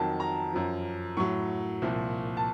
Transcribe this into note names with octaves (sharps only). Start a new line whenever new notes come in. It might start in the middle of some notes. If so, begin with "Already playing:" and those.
Already playing: F2 D#3 F#3 A5
A#5
F#2 F3
A2 F#3 C#6
C2 A#2 F3
A5